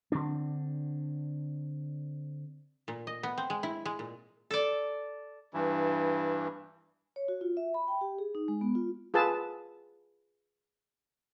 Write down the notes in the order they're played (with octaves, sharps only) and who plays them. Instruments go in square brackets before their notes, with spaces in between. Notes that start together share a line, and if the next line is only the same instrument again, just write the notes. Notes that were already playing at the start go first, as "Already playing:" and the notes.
[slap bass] D3 C4 D4
[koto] A#2
D#5
B3
C4
G#3
E4
G#3
A#2
A4 D5
[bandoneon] G2 E3
[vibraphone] C#5
F#4
F4
E5
B5
G5
G4
G#4
D#4
G#3
B3
F4
[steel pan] F4 G#4 B4 A5 E6